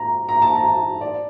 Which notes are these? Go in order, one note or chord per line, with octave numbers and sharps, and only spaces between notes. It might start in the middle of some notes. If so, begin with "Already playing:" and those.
Already playing: A#5
A#5
A5
A#5
D5